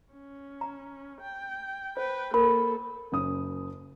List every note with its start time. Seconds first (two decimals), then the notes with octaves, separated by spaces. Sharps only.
0.13 C#4
0.61 A#5
1.21 G5
1.97 B4 C5 G5
2.34 A#3 A4 A#4 B5
3.12 F#1 F#2 C#4 D#6